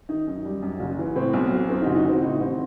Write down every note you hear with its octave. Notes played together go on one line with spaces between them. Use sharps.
D#3 D#4
F#2
G3
F#2
F#1
E3
A2 C4
B1
F#3
F#2 C4 E4
F#1 D#4 F#4
D#4 F#4
D#3 C4 E4
A2 D#4
A1 C4